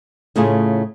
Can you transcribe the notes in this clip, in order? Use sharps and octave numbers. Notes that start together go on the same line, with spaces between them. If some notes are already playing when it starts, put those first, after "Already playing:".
A2 C#3 A3 F4 G#4